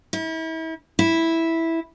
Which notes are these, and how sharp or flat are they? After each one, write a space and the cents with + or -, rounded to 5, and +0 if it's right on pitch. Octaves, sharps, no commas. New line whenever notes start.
E4 -35
E4 -5